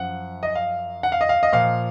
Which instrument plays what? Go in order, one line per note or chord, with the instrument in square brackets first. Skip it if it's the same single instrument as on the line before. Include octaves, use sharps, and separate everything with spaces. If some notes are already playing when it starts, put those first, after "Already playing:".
Already playing: [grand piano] F#2 F3 F#5
D#5
F5
F#5
F5
D#5
F5
D#5
A#2 F3 F5